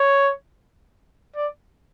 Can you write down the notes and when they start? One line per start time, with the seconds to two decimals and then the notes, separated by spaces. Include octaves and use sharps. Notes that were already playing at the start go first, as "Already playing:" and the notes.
Already playing: C#5
1.35 D5